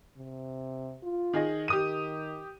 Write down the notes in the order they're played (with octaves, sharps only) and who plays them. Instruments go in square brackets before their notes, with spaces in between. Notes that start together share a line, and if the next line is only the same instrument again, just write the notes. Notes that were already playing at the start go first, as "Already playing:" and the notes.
[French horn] C3
F4
[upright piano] D#3 G#4 D#5
[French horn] D#3 [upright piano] G4 D#6 D#7